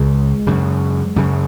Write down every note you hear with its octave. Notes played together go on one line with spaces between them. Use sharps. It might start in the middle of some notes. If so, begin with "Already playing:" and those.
Already playing: C#2 C#3 G#3
F#2 C#3
F#2 C#3